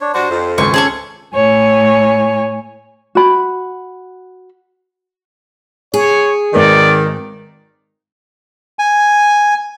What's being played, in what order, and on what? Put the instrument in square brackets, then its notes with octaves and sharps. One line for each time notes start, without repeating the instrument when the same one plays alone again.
[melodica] D4 C#5
[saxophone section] G2 D4 F#4 [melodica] C5
[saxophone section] F2
[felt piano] G#1 C#2 B4 [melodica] C5 G#5 [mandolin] C#6
[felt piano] C#4 [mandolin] G#4 A4 C#6
[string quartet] A2 C#5 G#5
[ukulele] F#4 B5
[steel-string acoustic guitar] G#4 [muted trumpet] C#5
[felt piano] G#1 B4 [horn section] D#3 [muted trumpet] D5
[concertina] G#5